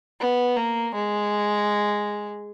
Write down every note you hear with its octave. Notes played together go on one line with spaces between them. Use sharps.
B3
A#3
G#3